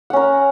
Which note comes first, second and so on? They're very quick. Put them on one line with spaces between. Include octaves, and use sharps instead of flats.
F#5 C#4 A#4